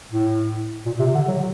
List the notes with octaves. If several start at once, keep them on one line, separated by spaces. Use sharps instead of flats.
A2
A#2
C3
D3
F#3